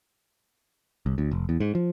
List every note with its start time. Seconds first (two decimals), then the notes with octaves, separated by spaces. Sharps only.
1.06 C2
1.18 D2
1.31 F1
1.49 E2
1.60 G#2
1.75 F3